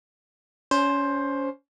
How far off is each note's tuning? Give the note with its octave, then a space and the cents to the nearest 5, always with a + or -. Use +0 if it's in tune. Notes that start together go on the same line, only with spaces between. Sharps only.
C#4 +25 C5 +10